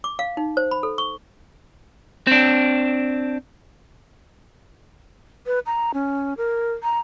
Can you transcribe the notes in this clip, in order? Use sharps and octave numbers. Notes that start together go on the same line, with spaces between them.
D6
F5
D#4
C5
B5
A4
C#6
C4 D4
B4
A#5
C#4
A#4
A#5